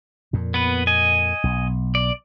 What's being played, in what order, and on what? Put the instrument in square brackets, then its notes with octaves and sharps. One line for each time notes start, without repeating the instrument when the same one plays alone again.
[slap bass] F2 A#2
[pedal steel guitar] B3 B4
D#5 G#5
[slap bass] B1
[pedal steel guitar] D5